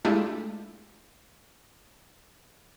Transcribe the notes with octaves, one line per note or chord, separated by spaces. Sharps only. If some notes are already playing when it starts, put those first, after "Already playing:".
G#3 A3 D4 E4 F4 G4